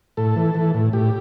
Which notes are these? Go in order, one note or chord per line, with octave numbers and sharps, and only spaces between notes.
A2 A4
E3
E3
A2
A2 G4